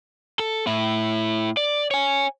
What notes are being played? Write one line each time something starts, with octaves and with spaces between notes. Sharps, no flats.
A4
A2 E4
D5
C#5 G#5